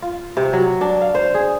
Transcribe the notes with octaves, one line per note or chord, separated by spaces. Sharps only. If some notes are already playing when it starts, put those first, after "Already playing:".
F4
C3
F#3
D4
F5
C5
G#4